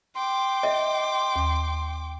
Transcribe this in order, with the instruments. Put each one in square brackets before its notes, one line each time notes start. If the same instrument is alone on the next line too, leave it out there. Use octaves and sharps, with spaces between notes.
[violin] G5 D6 [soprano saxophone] C6
[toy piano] D#5 E5
[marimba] D#2